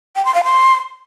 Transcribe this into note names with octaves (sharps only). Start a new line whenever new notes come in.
G5
C6
F5
C6